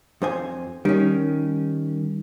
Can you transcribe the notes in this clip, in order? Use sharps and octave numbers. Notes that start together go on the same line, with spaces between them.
F2 C5 G#5
D#3 G3 C#4